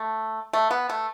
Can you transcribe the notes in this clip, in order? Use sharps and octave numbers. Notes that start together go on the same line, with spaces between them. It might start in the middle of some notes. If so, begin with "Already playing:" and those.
Already playing: A3
A3
B3
A3